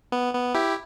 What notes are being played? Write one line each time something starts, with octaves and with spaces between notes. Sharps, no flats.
B3
B3
E4 G4